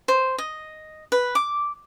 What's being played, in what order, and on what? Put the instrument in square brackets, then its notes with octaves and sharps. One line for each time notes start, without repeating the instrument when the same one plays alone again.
[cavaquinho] C5
D#5
B4
D6